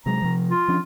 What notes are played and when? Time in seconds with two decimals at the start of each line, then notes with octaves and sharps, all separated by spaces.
0.06 C3 F#3 G#3 A#5
0.22 C3 F3
0.51 F4
0.68 F3 C#4 D4